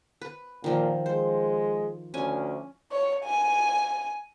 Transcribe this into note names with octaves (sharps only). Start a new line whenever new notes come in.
B4
A#2 D#3 F3
G#3 C5
D2 C#4 G#5
C#5
G#5